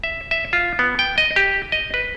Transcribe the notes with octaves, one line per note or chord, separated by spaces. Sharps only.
E5
E5
F4
B3
G5
D#5
G4
D#5
B4